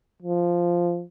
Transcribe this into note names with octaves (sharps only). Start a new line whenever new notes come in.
F3